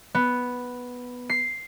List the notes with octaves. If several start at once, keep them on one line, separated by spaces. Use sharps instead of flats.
B3
C7